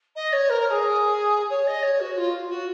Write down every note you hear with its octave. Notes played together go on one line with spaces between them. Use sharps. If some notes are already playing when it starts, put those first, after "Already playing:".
D#5
C#5
A#4
A#4
G#4
C#5
D#5
C#5
F#4
F4
F#4